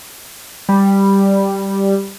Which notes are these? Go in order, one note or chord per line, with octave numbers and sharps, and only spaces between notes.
G3